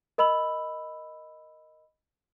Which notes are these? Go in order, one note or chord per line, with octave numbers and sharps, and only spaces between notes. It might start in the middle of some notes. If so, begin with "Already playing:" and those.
A#4 D#5 B5 E6 F#7